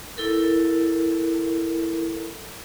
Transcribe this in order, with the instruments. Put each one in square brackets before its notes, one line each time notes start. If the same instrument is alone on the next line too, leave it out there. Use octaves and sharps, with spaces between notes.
[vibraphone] E4 A4 A#4